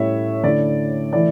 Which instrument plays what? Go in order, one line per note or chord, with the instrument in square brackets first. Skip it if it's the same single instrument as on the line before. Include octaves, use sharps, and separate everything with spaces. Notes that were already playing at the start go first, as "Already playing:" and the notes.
Already playing: [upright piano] A2 G3 C#4 E4 C#5 E5
D3 A3 C#4 E4 D5
E3 A3 E4 D5